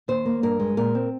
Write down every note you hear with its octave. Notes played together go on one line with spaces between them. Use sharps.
D#2 C5
A#3
G2 A#4
G#3
A#2 A#4
C4